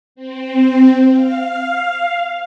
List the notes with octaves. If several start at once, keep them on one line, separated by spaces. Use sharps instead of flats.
C4
F5